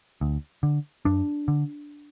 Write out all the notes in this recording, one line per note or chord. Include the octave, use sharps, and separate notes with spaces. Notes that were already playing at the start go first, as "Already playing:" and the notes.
D2
D3
F#2 D4
D3